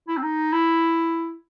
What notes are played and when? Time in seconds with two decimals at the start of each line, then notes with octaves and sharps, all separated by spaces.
0.08 E4
0.17 C4
0.23 D#4
0.53 E4